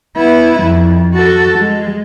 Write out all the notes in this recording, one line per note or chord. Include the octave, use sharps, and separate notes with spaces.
B3 E4
F2
F#4 A4
G#3